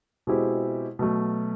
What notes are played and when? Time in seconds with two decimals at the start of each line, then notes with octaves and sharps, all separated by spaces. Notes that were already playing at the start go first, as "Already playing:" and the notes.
0.27 B2 G#3 C4 E4 G4
0.99 B2 F#3 A3